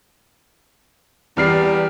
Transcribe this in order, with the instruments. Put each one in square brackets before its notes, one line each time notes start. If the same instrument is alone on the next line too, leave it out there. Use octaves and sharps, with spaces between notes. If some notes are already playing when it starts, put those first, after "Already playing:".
[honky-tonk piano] E2 F6 C7 [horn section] G3